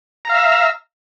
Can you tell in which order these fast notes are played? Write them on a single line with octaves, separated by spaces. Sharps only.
A#5 F5 E5